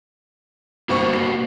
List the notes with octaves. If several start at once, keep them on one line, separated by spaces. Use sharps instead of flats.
G1 B2 A#3 C4 F#4 C#6
C7